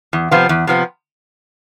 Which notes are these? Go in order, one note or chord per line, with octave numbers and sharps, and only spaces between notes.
E2
C3 F3 B3 F4
E2
C3 F3 B3